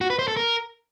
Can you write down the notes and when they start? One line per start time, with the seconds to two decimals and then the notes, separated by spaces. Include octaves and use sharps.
0.01 F#4
0.10 B4
0.19 C5
0.28 A4
0.37 A#4